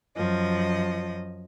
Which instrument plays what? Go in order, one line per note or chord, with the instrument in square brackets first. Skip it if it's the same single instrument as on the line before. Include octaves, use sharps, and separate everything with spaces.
[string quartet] F#2 F3 D#5